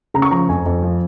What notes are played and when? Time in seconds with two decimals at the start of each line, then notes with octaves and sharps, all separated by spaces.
0.14 C#3 A#5
0.22 C#6
0.31 F3 A#5
0.49 F2 G#5
0.66 F2
0.83 F3